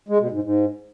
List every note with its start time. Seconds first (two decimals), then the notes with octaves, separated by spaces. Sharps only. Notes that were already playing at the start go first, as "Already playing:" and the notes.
0.09 G#3
0.20 B2
0.31 G#2
0.43 G#2